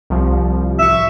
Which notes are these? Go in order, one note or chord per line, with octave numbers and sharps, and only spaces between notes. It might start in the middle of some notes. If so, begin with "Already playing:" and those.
C2 F3
A1 E5 C#6